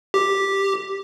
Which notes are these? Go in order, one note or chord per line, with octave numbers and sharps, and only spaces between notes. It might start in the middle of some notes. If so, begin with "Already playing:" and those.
G4